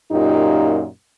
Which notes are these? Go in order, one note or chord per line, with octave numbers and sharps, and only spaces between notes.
F#2 A#2 D#4 F4 G4